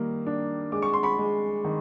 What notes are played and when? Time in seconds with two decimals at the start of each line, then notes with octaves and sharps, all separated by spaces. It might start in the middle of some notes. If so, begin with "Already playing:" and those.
Already playing: D#3 G3 A#3
0.26 D4
0.72 G#3 D6
0.82 C#6
0.93 C6
1.03 B5 C#6
1.19 G#3
1.65 D#3